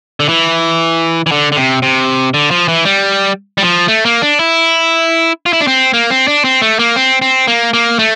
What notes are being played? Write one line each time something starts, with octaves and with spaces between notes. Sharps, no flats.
D3
E3
E3
D3
D3
C3
C3
D3
F3
E3
G3
G3
F3
A3
A#3
D4
E4
F4
E4
D4
C4
A#3
C4
D4
C4
A3
A#3
C4
C4
A#3
A#3
A3